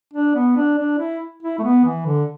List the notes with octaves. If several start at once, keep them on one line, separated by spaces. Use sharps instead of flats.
D4
B3
D4
D4
E4
E4
A3
B3
E3
D3